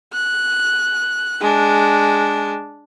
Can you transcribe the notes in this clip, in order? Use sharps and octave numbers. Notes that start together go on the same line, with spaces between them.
F#6
G#3 D4